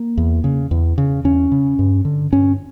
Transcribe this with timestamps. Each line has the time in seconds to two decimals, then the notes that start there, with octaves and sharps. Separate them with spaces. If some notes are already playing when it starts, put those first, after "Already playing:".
Already playing: A#3
0.17 E2
0.44 C#3
0.71 E2
0.98 C#3
1.24 E2 C#4
1.52 C#3
1.79 G2
2.05 D3
2.32 G2 C#4